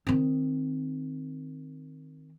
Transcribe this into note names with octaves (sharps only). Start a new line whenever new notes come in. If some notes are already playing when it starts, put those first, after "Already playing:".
D#3 C4